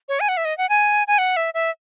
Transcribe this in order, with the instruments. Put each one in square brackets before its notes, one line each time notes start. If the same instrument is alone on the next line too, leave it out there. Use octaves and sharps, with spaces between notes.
[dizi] C#5
G#5
F#5
E5
D#5
F#5
G#5
G#5
F#5
E5
E5